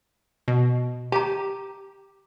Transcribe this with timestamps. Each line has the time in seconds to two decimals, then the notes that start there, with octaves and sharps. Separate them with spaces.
0.48 B2
1.12 G4 A5 A#5